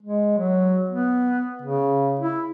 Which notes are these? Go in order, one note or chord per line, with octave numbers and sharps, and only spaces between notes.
G#3
F#3
B3
C#3
E4